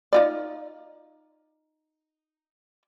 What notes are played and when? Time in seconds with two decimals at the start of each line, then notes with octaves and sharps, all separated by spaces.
0.13 D#4 F4 D5